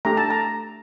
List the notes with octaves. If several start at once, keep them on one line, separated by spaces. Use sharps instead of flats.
A3 D4 G4 A#5
A5
A#5